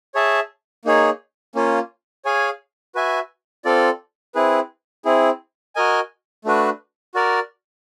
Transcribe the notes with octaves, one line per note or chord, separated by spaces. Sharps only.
G#4 C#5 E5 A5
A#3 D#4 G#4 C#5
A#3 C#4 F4
G#4 C#5 F5 G#5
F#4 B4 E5 G#5
C4 F4 A4 D5
C4 E4 G#4 B4
C4 E4 G#4
F#4 A#4 D#5 G#5
A3 D4 F#4 B4
F#4 A#4 D5